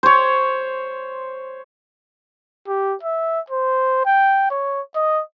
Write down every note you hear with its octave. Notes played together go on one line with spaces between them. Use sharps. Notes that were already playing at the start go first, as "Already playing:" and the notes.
C5 C#5
G4
E5
C5
G5
C#5
D#5